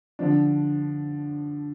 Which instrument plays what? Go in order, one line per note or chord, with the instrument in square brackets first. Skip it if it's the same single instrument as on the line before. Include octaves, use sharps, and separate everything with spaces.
[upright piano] D3 F3 D4